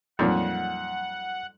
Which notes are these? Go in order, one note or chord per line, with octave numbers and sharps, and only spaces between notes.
F2 A#2 F#3 G3 D#4 F#5